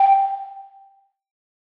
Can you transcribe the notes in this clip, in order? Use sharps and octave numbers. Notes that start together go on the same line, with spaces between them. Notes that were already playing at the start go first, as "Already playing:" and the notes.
Already playing: G5